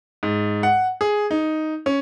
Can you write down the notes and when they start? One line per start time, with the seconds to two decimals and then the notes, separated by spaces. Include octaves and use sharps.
0.23 G#2
0.63 F#5
1.01 G#4
1.31 D#4
1.86 C#4